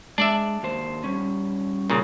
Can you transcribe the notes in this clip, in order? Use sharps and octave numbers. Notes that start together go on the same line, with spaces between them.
G#3 D4 D5 E5
D#2 C5
G3 C#4
A#2 C#3